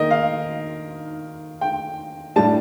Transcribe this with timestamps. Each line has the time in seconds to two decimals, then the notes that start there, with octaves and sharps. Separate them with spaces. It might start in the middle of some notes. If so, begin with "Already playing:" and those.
Already playing: D#3 A#3 A#4 D#5
0.11 F5
1.61 G5
2.36 A2 G3 D4 A5